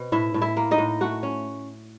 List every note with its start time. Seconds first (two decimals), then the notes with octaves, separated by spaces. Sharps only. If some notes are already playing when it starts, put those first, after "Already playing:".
Already playing: B2 C4
0.12 A2 E4 E5
0.34 A2
0.41 E4 E5
0.57 A#3
0.71 D#4 D#5
0.78 A2
1.01 A3 F#4 F#5
1.23 C#4